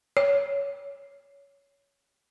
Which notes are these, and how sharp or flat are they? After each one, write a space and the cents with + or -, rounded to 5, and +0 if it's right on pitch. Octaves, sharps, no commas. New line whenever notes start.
C#5 +15